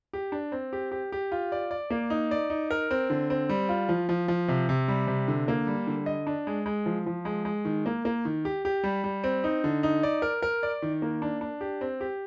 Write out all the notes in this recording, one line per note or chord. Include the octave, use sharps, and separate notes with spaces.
G4
D4
C4
G4
G4
G4
F4
D5
D5
A#3
D#4
D5
D#4
A#4
C4
D3
C4
G3
F4
F3
F3
F3
C3
C3
G3
C3
D3
A#3
G3
D3
D#5
D4
G#3
G#3
F3
F3
G#3
G#3
D#3
A#3
A#3
D#3
G4
G4
G3
G3
C4
D#4
D3
D#4
D5
A#4
A#4
D5
D#3
A#3
D4
D4
G4
C4
G4